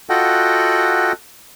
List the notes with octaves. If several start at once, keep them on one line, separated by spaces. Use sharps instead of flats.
F4 F#4 A4 D#5 F#5 G5